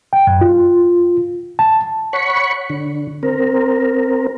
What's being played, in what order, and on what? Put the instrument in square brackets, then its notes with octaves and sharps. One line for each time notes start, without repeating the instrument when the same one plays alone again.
[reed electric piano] G5
F#2
F4
A5
[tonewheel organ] C#5 F#5 B5 C#6
D3
C4 A#4